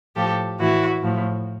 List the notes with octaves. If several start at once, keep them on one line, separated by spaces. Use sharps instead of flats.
A2 F3 G4 A4
A2 E3 E4 F#4
A2 F3